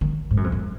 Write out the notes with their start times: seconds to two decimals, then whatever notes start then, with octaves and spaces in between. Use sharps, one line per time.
0.01 D#3
0.31 G#2
0.37 F#2
0.44 F2
0.52 F#2